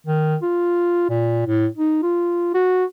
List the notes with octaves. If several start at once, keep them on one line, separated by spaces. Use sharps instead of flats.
D#3
F4
A#2
A2
D#4
F4
F#4